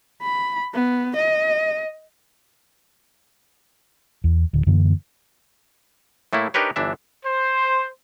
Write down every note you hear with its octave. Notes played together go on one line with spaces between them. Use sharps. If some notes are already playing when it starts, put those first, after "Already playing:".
B5
B3
D#5
E2
D1 D3
F#2 D3 E3 A#3
A2 A3 A#3 E4
D4 D#4 G4 A#4 B4 C#5
G1 E3 D4 E5
C5